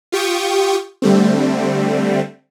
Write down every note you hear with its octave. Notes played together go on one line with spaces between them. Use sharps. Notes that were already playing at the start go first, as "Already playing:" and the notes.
F4 G4 G5 C#6 D#6
D3 G3 A3 C4